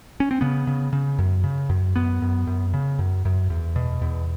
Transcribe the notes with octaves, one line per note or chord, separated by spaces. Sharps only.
C#4
C4
C#3 B3
C#3
C#3
F#2
C#3
F#2
F#2 B3
F#2
F#2
C#3
F#2
F#2
E2
B2
E2